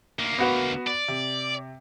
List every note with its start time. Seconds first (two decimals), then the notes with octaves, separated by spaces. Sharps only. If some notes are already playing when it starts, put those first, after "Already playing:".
0.19 D2 A#3
0.39 B3 F#4 B4
0.87 D5
1.08 C3